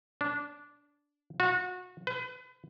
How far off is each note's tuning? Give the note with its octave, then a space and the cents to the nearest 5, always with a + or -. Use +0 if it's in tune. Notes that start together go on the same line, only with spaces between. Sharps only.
D4 -15
F#4 -30
B4 +35